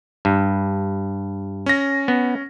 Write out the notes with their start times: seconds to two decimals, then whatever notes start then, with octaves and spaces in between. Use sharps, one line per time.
0.25 G2
1.66 C#4 A#6
2.08 B3